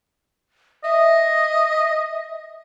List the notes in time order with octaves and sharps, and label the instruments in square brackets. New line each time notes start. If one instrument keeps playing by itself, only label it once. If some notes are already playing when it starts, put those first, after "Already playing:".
[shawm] D#5 [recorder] E5